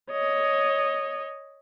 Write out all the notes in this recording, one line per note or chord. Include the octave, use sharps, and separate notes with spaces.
C#5 D#5